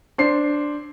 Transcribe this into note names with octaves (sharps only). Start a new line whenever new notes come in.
D4 C5 C7